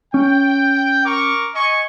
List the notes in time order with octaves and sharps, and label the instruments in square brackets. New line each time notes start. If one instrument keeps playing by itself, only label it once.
[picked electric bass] C#4 [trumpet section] G5
[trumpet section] A#4 C#6 D6
D#5 G#5 C#6